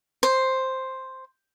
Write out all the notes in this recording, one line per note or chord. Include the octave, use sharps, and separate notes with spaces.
C5